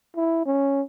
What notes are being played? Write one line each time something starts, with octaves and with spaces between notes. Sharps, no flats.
E4
C#4